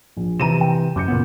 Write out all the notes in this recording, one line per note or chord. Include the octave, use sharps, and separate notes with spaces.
A#1
C3 E3 A#5 D#7 E7
G5
F#2 D6 G6 C#7
A#2 C#3 B3